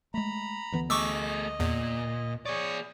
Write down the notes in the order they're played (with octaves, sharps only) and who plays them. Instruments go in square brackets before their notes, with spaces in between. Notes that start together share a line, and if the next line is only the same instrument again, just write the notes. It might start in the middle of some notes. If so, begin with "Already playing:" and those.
[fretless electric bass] G#3 A3 [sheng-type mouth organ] A#5 B5
[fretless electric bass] D2 E3 B3
[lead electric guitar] A3 G#4 [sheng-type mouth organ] D#5 [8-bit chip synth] C#6 D6 E6
[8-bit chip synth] E2 [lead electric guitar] A#2
[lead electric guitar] G#4 D5 [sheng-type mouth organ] C#5 C#6 D#6